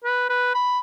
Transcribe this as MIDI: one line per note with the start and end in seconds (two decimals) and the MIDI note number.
0.04 0.27 71
0.30 0.53 71
0.54 0.79 83